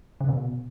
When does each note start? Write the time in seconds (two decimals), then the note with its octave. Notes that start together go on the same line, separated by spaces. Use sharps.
0.21 C#3
0.29 B2